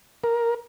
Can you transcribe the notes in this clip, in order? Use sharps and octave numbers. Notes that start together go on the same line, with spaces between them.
A#4